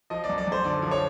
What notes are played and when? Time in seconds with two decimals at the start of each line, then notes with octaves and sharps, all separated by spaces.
0.10 F3 D#5
0.24 D5
0.29 F#2
0.38 D5
0.47 F#2 C5
0.64 D3 D5
0.82 F3
0.91 C#5